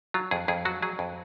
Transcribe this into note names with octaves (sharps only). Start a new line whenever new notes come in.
F#3 F4
F2 G#4
F2 G#4
F#3 F#4
F#3 G#4
F2